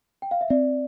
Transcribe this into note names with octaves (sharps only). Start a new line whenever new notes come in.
G5
F5
E5
C4 D5